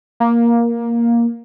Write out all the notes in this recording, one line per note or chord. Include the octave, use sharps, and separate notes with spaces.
A#3